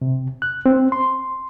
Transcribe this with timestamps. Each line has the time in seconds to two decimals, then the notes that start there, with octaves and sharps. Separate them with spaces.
0.02 C3
0.42 F#6
0.66 C4
0.92 C6